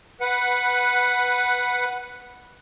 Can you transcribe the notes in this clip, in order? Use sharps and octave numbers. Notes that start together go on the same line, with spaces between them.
B4 F#5